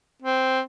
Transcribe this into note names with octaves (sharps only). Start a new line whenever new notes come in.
C4